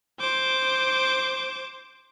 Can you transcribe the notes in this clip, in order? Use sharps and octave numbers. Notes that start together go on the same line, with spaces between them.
C5 D6